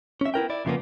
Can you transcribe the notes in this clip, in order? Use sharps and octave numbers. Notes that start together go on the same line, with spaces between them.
C#4 E5
B3 E4 A#4 G5
E4 D5
F2 C#3 F3 G3 A#3 B3